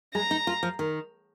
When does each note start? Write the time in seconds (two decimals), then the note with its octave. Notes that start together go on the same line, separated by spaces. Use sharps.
0.15 G#3 A#5
0.31 D#4
0.47 F4
0.63 F3
0.79 D#3